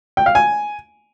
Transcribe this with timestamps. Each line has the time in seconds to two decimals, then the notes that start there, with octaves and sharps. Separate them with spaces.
0.17 G5
0.26 F5
0.35 G#5